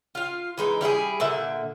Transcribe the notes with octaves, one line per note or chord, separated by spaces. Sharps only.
F4 F5
E3 G#3 D#4
G3 E4 F4 G#4
A#2 D3 E5